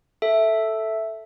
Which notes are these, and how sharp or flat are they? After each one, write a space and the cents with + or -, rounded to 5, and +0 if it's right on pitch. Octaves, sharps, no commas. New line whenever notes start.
A4 +0 E5 +0